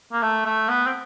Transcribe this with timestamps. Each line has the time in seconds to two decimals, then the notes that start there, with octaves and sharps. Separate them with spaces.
0.13 A#3
0.23 A3
0.46 A3
0.69 B3
0.87 C4